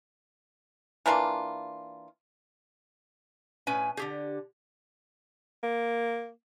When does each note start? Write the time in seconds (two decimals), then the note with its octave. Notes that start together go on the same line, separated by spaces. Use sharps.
1.06 E3 A#3 D4 F4
3.67 A2 C#4 B4 G#5
3.97 D3 G4 G#4
5.63 A#3